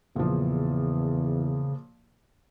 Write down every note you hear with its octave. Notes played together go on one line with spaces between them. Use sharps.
E2 A#2 C#3 F3